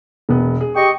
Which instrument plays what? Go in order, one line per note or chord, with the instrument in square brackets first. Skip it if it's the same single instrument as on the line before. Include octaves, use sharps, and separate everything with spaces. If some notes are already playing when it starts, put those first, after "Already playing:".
[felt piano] E1 B3 G#4
G#4
[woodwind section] G4 D#5 C#6